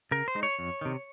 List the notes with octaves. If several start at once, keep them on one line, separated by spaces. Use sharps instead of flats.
C#3 A#4
C5
G#3 D#4
C#5
F2
C3 D#3